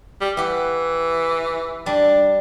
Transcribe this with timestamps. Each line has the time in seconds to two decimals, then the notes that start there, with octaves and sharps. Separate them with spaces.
0.21 G3
0.37 E3 G4 F#5
1.86 G3 D4